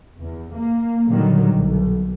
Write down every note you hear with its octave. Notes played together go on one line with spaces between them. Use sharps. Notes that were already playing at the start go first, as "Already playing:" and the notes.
E2
A#3
A#2 D3 D#3 F#3 G3
B1